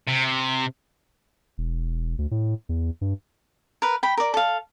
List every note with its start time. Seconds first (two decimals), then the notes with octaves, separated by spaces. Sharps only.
0.08 C3
1.58 E1
2.18 D2
2.31 A2
2.69 E2
3.01 G2
3.82 A#4 B4
4.03 G5 B5
4.17 A#4 D5
4.34 A4 F5